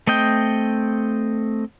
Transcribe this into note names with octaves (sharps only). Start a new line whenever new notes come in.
A3 C4 D#5 G5